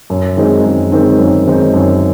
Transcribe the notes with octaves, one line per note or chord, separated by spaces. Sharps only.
F#2
D#3 G#3 C4 D#4
F#2
D#3 G#3 C4 D#4
F#2
D#3 G#3 C4 D#4
F#2